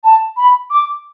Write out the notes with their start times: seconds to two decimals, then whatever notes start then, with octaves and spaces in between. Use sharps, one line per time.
0.04 A5
0.37 B5
0.70 D6